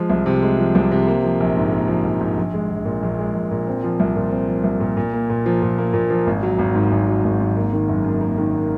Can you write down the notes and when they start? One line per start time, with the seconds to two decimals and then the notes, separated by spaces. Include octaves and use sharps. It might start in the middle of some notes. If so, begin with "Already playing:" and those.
Already playing: F3 G#3
0.10 C2
0.26 C3
0.43 G#3
0.58 F3
0.75 C2
0.91 C3
1.07 A#3
1.24 F3
1.40 A#1
1.56 G#2
1.72 A#3
1.88 F3
2.05 A#1
2.20 G#2
2.37 A#1
2.54 G#3
2.70 A#1
2.85 A#2
3.03 A#1
3.19 G#3
3.35 A#1
3.51 A#2
3.67 C4
3.84 F3
4.00 C2
4.16 A#2
4.31 C4
4.47 F3
4.64 C2
4.80 A#2
4.97 A#2
5.13 A#3
5.30 A#2
5.46 F3
5.62 A#2
5.78 A#3
5.93 A#2
6.10 F3
6.27 G#1
6.43 F#3
6.59 G#1
6.75 G#2
6.92 G#1
7.08 F#3
7.24 G#1
7.40 G#2
7.56 A#3
7.72 D#3
7.89 F#1
8.04 F#2
8.21 A#3
8.38 D#3